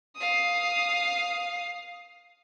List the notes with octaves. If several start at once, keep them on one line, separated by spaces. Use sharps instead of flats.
F5 D#6